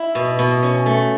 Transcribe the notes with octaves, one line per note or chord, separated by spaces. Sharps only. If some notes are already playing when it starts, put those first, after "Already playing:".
Already playing: E4 E5
B2
B2
C#4
A3